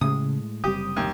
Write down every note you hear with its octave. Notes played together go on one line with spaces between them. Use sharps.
A2 C#3 G#3 D#6
F#1 C3 G3 G4 D#6
D#2